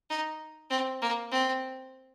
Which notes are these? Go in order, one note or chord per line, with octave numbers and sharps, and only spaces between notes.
D#4
C4
A#3
C4